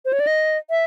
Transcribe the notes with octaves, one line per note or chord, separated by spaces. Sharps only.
C5
C#5
D5
D#5
E5